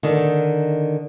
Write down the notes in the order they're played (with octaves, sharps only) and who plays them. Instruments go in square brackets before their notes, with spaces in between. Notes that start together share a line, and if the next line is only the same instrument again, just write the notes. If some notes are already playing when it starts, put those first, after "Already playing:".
[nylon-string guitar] D3 D#3